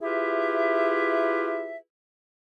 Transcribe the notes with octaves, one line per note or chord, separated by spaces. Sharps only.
E4 F4 G4 G#4 B4 E5